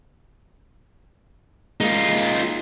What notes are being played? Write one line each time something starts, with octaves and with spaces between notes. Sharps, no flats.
G#3 A#3 D#4 F4